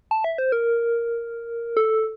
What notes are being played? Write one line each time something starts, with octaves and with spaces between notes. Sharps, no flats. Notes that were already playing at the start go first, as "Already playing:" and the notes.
A5
E5
C5
A#4
A4